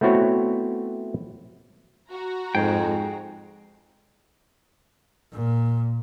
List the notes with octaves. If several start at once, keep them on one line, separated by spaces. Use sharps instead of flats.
A3 B3 C4 E4 F#4 C#5
F#4 A#5
F2 G#2 G#4 G5
G#2
A#2